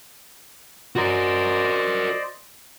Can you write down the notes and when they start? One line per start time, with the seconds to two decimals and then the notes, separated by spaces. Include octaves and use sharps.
0.96 F#4 A#4 C5 D5 D#5